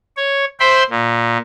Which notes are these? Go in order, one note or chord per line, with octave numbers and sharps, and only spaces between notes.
C#5
C5 E5 G5 B5 C6
A#2